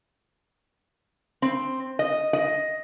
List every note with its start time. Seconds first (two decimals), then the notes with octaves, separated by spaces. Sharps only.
1.42 C4
1.99 D#5
2.33 D#5